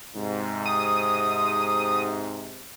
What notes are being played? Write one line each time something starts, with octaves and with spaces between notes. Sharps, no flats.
G#2 C3
D#6